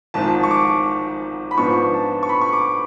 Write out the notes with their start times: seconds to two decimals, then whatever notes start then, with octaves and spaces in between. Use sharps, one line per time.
0.14 G#1 G#2 F3 A5
0.43 C#6
0.51 D6
1.51 B5
1.58 G#2 F3 B3 D4 C#6
1.94 A5
2.23 C#6
2.29 B5
2.41 C#6
2.53 D6